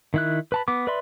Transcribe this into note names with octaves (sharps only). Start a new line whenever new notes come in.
D#3 E4 F#6
B4 A5 B5
B3 D6
B4 D5 E5 B5 C6